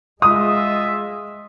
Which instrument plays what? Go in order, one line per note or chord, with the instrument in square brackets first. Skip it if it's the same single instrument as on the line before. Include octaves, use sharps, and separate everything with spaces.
[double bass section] G#3 [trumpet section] F4 D#5 E5 [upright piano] D#6